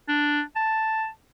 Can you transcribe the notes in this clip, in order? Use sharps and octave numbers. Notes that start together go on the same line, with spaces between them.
D4
A5